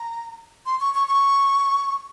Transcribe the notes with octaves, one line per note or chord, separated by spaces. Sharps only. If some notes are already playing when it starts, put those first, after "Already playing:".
Already playing: A#5
C6
C#6
C#6
C#6